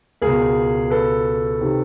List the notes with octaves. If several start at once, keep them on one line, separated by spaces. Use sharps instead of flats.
C#2 B2 G#4 A#4
A4 B4
C3 D#3